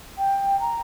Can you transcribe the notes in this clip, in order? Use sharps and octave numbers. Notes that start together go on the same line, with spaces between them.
G5
A#5